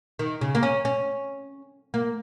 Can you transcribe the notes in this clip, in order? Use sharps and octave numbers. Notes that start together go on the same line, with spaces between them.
D#3
C#3
A#3
C#4
C#4
A#3